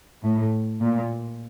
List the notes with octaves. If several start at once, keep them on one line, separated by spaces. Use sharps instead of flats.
A2
A#2